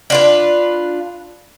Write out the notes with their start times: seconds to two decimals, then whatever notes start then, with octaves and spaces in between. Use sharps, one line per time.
0.10 D4 F4 B4